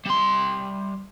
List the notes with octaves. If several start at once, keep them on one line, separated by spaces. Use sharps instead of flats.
G3 C6